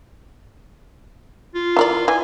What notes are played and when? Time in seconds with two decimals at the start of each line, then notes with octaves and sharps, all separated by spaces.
1.55 F4
1.77 E3 A#4 D5
2.08 E3 G#5